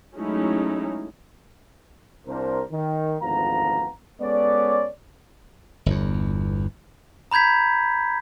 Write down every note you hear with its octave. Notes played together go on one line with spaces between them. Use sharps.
F#3 G#3 A3 C#4 D#4 E4
C2 D4 A#4 C5
D#3
G#1 D2 F3 B3 F5 A#5
G#3 B3 C#4 A4 C#5 D5
G1 E2
A#5 B5 G6 G#6 B6